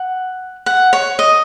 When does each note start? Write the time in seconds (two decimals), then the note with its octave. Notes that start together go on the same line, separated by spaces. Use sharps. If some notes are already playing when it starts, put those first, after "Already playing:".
Already playing: F#5
0.66 F#5
0.93 C#5
1.19 D#5